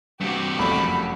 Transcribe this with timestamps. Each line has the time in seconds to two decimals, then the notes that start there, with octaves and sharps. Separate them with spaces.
0.21 G2 C3 F#4 G4
0.59 F#1 F2 A3 B5